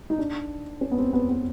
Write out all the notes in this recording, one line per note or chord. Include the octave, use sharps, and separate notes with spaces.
D#4
D4
C#4
B3
C4
B3
B3